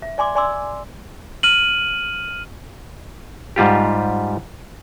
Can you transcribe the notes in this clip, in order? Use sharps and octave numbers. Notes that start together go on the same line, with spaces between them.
E5
D5 G#5 C6 D6
D5 G#5 C6 D6 E6
F6 D#7 F#7
G#2 G3 F4 G4